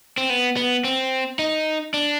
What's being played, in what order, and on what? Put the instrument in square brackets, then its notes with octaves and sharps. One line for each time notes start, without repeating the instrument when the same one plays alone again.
[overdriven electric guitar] C4
B3
B3
C4
D#4
D4